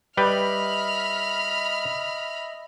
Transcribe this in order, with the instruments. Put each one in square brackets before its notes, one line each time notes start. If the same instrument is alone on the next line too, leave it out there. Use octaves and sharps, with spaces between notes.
[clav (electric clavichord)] G3 B4 G5 [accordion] D#5 E5 [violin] B5 F6